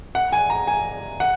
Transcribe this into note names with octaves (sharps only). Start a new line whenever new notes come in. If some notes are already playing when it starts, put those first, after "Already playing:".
F#5
G#5
A#5
G#5
F#5